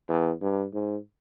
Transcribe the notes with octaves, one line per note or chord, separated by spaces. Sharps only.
E2
G2
G#2